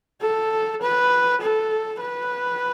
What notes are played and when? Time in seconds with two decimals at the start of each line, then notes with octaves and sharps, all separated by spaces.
0.22 A4
0.82 B4
1.41 A4
2.00 B4